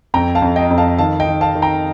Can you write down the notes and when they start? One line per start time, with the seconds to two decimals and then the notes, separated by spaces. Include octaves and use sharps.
0.14 F2 G5 A#5
0.35 F5 A5
0.42 F2
0.56 D#5 G5
0.70 F2
0.78 F5 A5
0.98 D#3 F5 A5
1.20 D#5 G5
1.27 D#3
1.41 F5 A5
1.55 D#3
1.62 G5 A#5